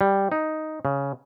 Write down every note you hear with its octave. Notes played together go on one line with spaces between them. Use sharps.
G3
D#4
C#3